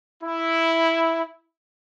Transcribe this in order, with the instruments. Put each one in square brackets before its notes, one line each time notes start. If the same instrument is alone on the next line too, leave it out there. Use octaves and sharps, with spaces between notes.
[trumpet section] E4